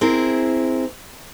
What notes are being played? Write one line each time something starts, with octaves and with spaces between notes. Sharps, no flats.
C4 E4 G#4 A#4